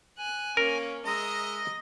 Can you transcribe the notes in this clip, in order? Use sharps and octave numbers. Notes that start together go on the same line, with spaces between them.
G#5 F#6
A#3 C#4 A#4
G#3 D#5 E5 A#5 D#6 A#6